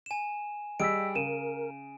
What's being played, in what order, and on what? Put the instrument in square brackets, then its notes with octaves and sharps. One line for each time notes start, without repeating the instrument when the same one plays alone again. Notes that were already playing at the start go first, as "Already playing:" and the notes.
[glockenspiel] G#5 E7
[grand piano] G3 G4 G#4 [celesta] D#5 E6 B6 [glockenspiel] D7
[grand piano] C#3 [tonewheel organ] A#4 [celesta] D#7 E7